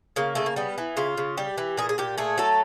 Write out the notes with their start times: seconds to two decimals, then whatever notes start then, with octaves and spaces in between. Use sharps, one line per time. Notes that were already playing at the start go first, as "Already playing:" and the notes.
0.16 C#3 A#3
0.35 C#3 A3
0.46 A#3
0.56 G3 B3
0.78 E3
0.97 C#3 F4
1.17 C#3
1.37 G3 G4
1.58 E3
1.77 A#2 G#4
1.89 G#4
1.98 A#2 G4
2.18 A3 G#4
2.38 F#3 A4